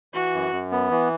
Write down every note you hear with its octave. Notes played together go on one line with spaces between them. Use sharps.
E3 F#4
F#2
F#2
B3
E3